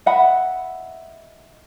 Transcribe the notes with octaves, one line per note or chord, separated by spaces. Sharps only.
D#5 E5 F#5 B5